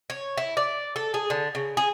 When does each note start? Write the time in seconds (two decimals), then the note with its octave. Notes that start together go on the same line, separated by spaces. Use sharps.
0.10 C#5
0.37 E4
0.57 D5
0.96 A4
1.14 G#4
1.30 D3
1.55 C#3
1.77 G#4